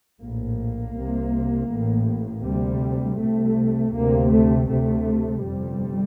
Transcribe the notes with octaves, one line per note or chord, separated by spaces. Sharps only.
A#1 A2 A#3
C2 C3
A1 A2
D2 C3 G3
C2 C3 A3
D2 C3 A#3
A3
D2 C3 A3
G1 F2 C3 G3